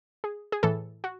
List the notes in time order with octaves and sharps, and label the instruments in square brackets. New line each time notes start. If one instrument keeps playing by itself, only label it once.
[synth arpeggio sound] G#4
G#4
A2 E3 A4
F#4